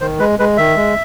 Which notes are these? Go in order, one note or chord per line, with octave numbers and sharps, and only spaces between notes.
D#3 C5
G#3 B4
G#3 B4
D#3 E5
G#3